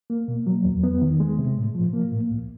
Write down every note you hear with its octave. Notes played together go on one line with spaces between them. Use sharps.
A#3
B2
F#3
E2
B3
D#3
G#3
C3
A2
F3
A#3
A2
C2